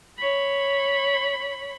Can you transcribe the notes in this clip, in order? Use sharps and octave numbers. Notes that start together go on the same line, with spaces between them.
C#5 B5